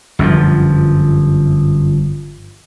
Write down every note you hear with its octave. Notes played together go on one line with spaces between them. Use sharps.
G1 F#2 D3 F3